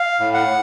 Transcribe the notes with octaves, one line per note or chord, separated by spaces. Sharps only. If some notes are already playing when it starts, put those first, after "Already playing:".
Already playing: F5
A2
F#5